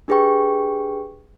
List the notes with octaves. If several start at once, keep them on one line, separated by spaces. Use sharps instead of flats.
D4 G4 G#4 B4 G5 C#6